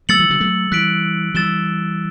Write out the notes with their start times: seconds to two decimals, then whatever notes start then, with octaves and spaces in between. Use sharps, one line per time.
0.09 F#3 A3 E6 A6 C#7 F#7
0.19 E3 G3
0.30 D3 F#3
0.40 F#3 A3
0.71 E3 G3 F#6 B6 D7 F#7
1.34 E3 G3 E6 A6 E7 G7